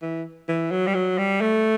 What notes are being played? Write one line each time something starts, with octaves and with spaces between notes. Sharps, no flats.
E3
E3
F#3
G3
F#3
G3
A3